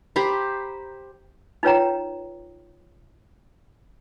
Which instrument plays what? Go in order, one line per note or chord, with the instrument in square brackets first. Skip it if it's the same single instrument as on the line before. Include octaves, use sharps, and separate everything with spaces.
[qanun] G4 C5 A#5 B5
[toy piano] D#4 F4 B4 C#5 G5 A#5